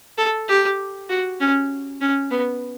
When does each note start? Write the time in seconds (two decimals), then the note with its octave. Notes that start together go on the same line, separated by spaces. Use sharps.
0.18 A4
0.48 G4
1.09 F#4
1.40 C#4
2.01 C#4
2.31 B3